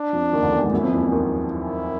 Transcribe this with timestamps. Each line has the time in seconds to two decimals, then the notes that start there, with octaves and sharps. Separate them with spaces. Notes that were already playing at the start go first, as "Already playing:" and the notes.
Already playing: D4
0.13 F2 F3
0.33 D#2 D#3
0.43 D2 D3
0.52 E2 E3
0.63 G#2 G#3
0.72 F#2 F#3 E4
0.83 F2 F3
0.92 E2 E3
1.02 E2 E3
1.12 D#2 D#3
1.52 E4